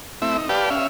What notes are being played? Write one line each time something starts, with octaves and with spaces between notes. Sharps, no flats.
A3 C4 E4 E5
D#4
G4 B4 D5 F5 G5 A5
C#4 E5 F5